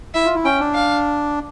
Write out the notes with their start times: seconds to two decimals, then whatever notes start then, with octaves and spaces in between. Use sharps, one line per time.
0.14 E4 E5
0.25 F4
0.35 E4
0.45 C#4 G5
0.60 D4
0.75 F5